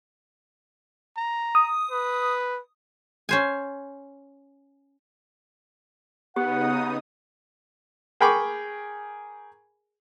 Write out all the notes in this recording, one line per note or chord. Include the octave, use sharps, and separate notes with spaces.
A#5
D#6
B4
C#4 C5 G#5
C#3 B3 D#4 G4 F#5 D#6
G#4 A#4 G5 B5 C#6 D6